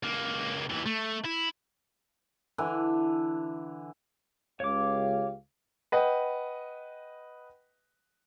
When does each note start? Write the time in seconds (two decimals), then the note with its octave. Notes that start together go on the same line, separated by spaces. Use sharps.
0.03 C#2 A#3
0.70 D#2 E3
0.86 A3
1.25 E4
2.58 D3 E3
4.60 C#2 G4 C#5 F5 D6
5.92 B4 D#5 F#5 G5